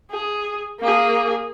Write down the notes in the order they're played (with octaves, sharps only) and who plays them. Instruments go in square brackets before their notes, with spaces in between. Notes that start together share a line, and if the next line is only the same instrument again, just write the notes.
[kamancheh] G#4
A#3 G#4